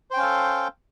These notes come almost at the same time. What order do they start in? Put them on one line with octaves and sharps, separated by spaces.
C5 G5 C#4 F5 A4